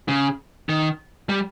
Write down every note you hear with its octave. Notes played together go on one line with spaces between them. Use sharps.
C#3
D#3
G3